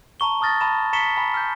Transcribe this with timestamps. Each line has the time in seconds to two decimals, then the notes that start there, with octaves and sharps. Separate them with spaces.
0.20 A5 A#5 C#6 G7
0.41 A5 D#6 F6 A6 A#6
0.61 A5 B5 E7
0.93 A#5 C#6 B6 C#7 E7 G7
1.17 G#5 B5
1.34 F6 G6